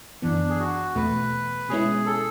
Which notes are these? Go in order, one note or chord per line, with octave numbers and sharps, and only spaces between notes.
F#2 E3 B3 D4
G#4
F#4
E2 B2 A3 B4
B2 G#3 C#4 E4 G#4
A4